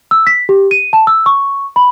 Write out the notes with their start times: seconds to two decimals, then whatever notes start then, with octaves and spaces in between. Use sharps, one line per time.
0.11 E6
0.27 B6
0.49 G4
0.71 D#7
0.93 A5
1.07 E6
1.26 C#6
1.76 B5